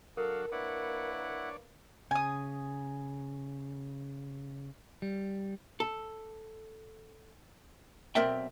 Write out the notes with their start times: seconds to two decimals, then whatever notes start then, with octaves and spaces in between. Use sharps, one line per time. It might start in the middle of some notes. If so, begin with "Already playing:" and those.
0.17 F#3 D4 F#4 A4 A#4 F5
0.52 A#3 D4 E4 B4 C#5 D5 F#5
2.11 C#3 G#5 D#6
5.02 G3
5.80 A4
8.15 B1 C4 A#4 D5 E5 G5